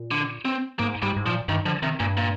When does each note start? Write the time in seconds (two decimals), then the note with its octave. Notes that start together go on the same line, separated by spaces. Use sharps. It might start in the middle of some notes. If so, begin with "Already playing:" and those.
Already playing: A#2
0.11 D3
0.45 C4
0.79 G#2 A#3
1.03 G#2 G3
1.17 G#2
1.25 A#2 F3
1.48 G2 D#3
1.65 D3 F3
1.82 C3 D#3
2.00 G2 A#2
2.17 A#2